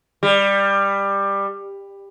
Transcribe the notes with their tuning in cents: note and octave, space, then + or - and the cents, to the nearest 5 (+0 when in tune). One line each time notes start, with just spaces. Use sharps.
G3 +15